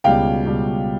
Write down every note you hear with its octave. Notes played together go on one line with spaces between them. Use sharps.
C#2 B2 G3 F5 G5
C#2 B2 G3